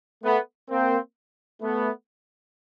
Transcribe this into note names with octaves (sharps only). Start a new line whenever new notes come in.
A3 B3
A#3 C4
A3 B3